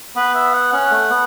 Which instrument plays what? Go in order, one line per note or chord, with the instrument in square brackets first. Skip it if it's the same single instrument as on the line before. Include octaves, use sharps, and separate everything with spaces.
[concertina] B3 [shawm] B4
[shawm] E5
F#5
[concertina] C#4 [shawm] F#5
[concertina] A3
B3